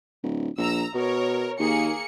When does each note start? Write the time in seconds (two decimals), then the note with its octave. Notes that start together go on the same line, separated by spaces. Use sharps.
0.23 D1
0.57 A#1 A#5 E6
0.94 B2 A#4 C#5
1.59 D#2 A#3 G#4 C#7